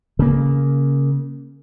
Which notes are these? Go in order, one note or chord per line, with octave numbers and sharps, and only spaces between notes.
C#3 A#3